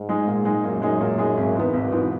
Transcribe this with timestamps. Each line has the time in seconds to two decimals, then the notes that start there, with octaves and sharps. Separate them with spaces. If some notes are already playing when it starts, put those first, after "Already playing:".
Already playing: G#2
0.09 G#3 D#4 G#4
0.27 A#2
0.45 G#3 D#4 G#4
0.64 F#2 A#2
0.82 G#3 D#4 G#4
1.00 A#2
1.18 G#3 D#4 G#4
1.37 G#1
1.55 G#2 E3 B3
1.73 G#1 B2
1.92 G#2 E3 B3